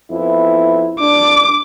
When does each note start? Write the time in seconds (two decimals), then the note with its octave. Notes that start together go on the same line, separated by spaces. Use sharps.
0.11 F2 B3 E4
1.00 D4 D6